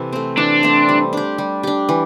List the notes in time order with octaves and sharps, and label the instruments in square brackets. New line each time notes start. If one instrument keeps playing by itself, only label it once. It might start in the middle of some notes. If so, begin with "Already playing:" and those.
Already playing: [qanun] C3 E3 E4 A4
A3 C4
[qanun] E3 [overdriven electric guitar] D4
[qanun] A3 C4
G3
D4 G4
G3
D4 G4
E3